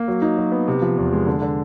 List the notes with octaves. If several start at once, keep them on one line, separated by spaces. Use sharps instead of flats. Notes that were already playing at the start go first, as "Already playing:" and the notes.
Already playing: A#3
F#3
D#4
F#3
B3
C3
F3
E2
G#3
D3
D3